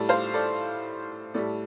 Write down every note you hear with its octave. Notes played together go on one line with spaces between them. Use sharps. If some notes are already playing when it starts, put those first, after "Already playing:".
Already playing: A2 G3 A4 D5
C5 F5
A4 D5
A2 G3 A4 D5